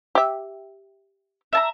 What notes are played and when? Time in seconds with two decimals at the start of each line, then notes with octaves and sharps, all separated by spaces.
0.15 G4 E5
1.53 E5 A5 A#5